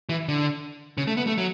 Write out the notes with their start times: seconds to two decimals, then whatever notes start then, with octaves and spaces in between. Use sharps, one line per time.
0.09 E3
0.28 D3
0.98 C#3
1.07 A3
1.17 B3
1.27 A3
1.38 F#3